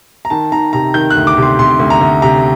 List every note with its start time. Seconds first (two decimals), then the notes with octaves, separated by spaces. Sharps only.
0.25 A#5
0.30 D#3 A5
0.52 D#3 A#5
0.73 C3 A#5
0.94 D#3 G6
1.10 F#6
1.16 D2
1.27 D6
1.37 C3
1.43 C6
1.59 C3 C6
1.80 D2
1.90 A#5
2.01 D2
2.22 C3 A#5